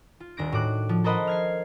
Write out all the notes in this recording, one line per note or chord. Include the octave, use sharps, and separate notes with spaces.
F4
D#1 D4 A#6 D7
A2 F#4 D6 F#6
F3
A4 A#4 C5 D#5 F#5 B5
F6 G#6 C7